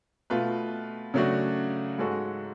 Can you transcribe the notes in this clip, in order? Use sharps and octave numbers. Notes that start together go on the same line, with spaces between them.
B2 A3 F4 B4
C#3 F#3 A3 D4 F#4
G#2 G#3 C#4 F#4 A4